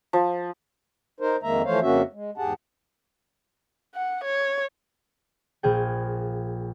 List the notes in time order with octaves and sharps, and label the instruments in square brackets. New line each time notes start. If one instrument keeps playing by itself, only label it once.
[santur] F3
[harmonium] D#4 A#4 C5
F2 D#3 G#3 A#3 E5 A#5
E3 F3 A3 C5 C#5 F5
F2 C#3 A#3 C#4 F#4 E5
G#3
E2 G#2 G4 G#4 F#5 A5
[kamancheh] F#5
C#5
[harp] A#1 F4 G#4 G5